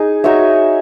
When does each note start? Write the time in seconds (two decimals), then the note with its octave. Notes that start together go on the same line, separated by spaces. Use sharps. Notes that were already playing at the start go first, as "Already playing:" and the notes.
Already playing: D#4 G#4
0.24 D#4 F#4 C#5 E5